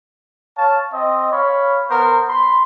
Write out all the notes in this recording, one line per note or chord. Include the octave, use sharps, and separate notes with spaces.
C#5 F5 A5
C4 D#5
C#5 F5 B5
B3 A#4 C5
B5 C6